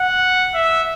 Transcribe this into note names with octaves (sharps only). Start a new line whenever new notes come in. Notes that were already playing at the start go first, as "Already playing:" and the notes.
Already playing: F#5
E5